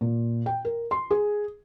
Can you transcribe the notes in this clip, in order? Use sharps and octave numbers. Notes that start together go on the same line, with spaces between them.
A#2
G5
A#4
C6
G#4